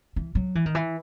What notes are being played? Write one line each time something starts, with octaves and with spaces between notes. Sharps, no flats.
E3
F#3
E3
D#3
E3